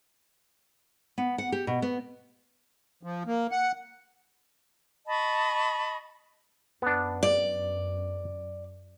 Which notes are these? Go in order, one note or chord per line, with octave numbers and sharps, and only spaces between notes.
B3
F#5
G4
B2
B3
F3
A#3
F#5
D#5 A5 B5 C#6
F#2 B3 D4
D5